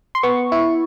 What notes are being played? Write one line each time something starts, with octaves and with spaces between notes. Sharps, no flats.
C6
B3 C#6
E4